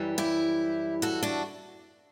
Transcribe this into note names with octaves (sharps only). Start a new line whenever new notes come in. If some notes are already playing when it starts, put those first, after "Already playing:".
Already playing: F#2 E3 G3
E4 G4
F#4 A4
D4 F#4